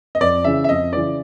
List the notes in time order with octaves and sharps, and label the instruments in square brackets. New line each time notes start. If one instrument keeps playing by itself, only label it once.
[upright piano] D#5
[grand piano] F2 [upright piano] D5
[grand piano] C#3 E3 [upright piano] E5
[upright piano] E5
[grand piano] F2 [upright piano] D#5
[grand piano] C#3 E3 [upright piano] D5